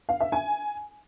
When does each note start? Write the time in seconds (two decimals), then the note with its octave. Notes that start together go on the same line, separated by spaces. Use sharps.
0.09 F5
0.20 E5
0.32 G#5